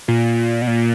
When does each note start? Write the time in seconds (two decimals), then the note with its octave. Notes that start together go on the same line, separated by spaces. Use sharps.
0.08 A#2
0.62 B2
0.67 A#2